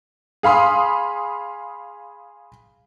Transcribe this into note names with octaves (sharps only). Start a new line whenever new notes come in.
G#4 F5 B5 C6 D#6